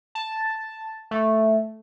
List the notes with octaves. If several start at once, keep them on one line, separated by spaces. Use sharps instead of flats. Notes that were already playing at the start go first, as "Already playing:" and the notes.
A5
A3